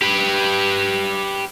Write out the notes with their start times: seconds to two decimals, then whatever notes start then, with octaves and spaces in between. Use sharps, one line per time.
0.02 G4 B4